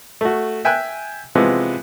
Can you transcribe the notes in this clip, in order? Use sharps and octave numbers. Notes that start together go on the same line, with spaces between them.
A3 F#4
E5 G5 G#5 F#6
C3 E3 F3 G#3 B3